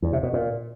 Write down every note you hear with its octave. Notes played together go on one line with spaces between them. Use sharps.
E2
C3
B2
A#2